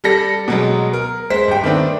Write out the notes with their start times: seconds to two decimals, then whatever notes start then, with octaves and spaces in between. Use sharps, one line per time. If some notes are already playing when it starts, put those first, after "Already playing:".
0.04 G3 A4 A#6
0.48 B2 F#3 G#3
0.93 A#4
1.30 G#3 C5 B6
1.48 G2 G5
1.64 D#3 A3 B3 C4 D4